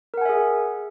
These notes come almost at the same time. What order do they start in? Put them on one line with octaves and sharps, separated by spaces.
A#4 F#5 G#5 E5 G#4